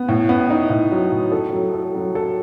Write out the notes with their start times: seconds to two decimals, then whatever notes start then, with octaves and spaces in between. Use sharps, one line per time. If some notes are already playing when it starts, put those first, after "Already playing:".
Already playing: B3
0.08 A2
0.29 B3
0.50 D#4
0.70 A2
0.92 F#3
1.12 A2
1.32 A4
1.53 F#3
1.73 A4
1.95 F#3
2.15 A4